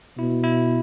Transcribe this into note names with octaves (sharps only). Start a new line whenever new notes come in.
B2 E4
E4